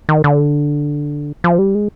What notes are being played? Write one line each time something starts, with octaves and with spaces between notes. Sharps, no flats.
D#3
D3
F3
G3
G#3